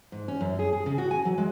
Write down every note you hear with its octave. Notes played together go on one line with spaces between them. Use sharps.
G#2
C#4
F#2
G#4
G#4
C#3
F#4
G#5
F#3
G#3